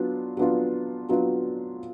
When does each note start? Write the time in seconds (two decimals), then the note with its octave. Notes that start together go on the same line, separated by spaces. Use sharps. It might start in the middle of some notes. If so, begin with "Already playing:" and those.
Already playing: F#3 B3 D4 F4
0.37 F#3 B3 D4 F4
1.09 F#3 B3 D4 F4